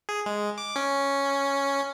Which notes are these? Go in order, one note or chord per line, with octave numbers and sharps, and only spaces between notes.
G#4
G#3
D6
C#4